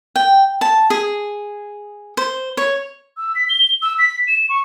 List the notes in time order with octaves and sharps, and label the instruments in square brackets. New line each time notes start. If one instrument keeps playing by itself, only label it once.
[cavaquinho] G5
A5
G#4
C5
C#5
[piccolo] E6
B6
G7
E6
B6
E7
C#6